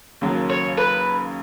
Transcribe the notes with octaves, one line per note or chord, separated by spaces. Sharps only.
D#2 C#3 F#3 A#3
C#5
B4